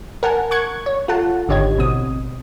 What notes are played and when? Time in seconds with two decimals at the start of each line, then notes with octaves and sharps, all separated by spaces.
0.23 A#4 F#5 G#5 A5
0.51 C#6 F#6 G#6 C#7
0.86 C#5
1.08 F4 A4 F#5 A5
1.48 G#1 D3 G4 C#5 D#5 G#6
1.77 A1 B2 C4 D#6